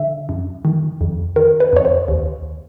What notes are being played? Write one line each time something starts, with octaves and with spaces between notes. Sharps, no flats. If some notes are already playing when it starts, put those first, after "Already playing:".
Already playing: D3 E5
F#2
D#3
F2
D#3 A#4
B4
F2 C#5
C5
D#2